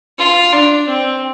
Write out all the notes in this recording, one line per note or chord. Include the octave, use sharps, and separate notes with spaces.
F4
D4
C4